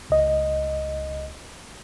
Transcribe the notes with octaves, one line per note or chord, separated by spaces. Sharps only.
C#2 D#5